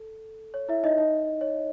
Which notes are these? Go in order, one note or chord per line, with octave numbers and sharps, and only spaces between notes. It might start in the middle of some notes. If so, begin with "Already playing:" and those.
Already playing: A4
C#5
E4 E5
D#4 D#5
D#4 D#5
C#5